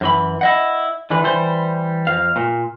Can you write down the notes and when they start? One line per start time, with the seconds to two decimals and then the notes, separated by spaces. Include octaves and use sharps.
0.01 F#2 E3 B5
0.41 E4 D#5 F#5
1.11 D3 E3 D4 B4
1.24 E3 G3 C5
2.07 F2 F5
2.36 A#2